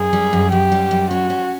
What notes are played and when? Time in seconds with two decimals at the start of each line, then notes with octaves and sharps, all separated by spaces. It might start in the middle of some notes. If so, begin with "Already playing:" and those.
Already playing: F#2 G#4
0.13 G3
0.33 F#2
0.52 F#2 G4
0.72 G3
0.91 F#2
1.11 C#4 F#4
1.30 C#4